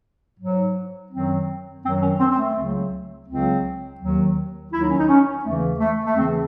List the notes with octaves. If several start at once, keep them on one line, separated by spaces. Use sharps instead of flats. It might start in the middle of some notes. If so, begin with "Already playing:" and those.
G#2 F#3
F#2 D#3 F#3 C4
F#2 D#3 F#3 C4
C#4
C4
C4
A3
C#2 C#3 F#3
C#2 C#3 F#3 C4
D#2 D#3 F#3
D#2 D#3 F#3 E4
D#4
C#4
D#4
C#4
E2 C#3 E3 A3
A3
A3
E2 C#3 E3 C4